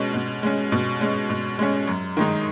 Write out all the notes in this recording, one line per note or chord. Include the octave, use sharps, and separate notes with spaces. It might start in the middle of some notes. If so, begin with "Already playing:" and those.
Already playing: B2 G#3 C#4
B2
G#3 C#4
B2
G#3 C#4
B2
G#3 C#4
F#2
D#3 G#3 D#4